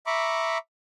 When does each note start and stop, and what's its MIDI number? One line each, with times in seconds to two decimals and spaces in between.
0.07 0.58 76
0.07 0.58 82
0.07 0.58 83
0.07 0.58 85
0.07 0.58 86